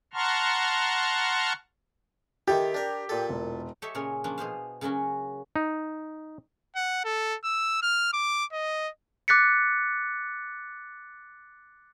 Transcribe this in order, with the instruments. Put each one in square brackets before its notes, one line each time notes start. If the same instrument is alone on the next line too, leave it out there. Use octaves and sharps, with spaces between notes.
[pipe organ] F#5 A5 A#5 C6 C#6 F6
[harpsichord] D#3 E4 A4 [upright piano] G4
[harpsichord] D4 A#4
A#2 A4
[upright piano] E1
[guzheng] G4 A4 C#5 D#5 E5 G5
A#2 C#3 G#4 A#4 C#5
F3 A#3 C#4 D4
B2 G#4 C5 F5
C#3 F#3 A#3 C#4 F#4
[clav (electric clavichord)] D#4
[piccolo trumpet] F#5
A4
E6
F6
D6
D#5
[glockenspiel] D6 F#6 A6 B6 C#7